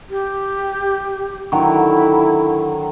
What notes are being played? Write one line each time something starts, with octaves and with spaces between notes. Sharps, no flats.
G4
D3 D#3 F#3 E4